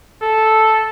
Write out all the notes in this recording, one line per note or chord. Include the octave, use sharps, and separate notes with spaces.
A4